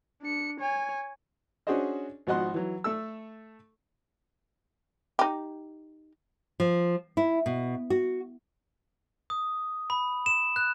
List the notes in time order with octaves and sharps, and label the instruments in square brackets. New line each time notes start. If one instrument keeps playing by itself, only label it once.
[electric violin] D4 C#7
C#5 G#5
[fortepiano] C#4 D4 F#4 G#4 C5 D#5
G#1 F3 F#4 D#5 F#5 C6
E3 F#3
A3 A4 E6
[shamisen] D#4 G4
[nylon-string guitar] F3
E4
B2
F#4
[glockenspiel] D#6
B5
E7
F#6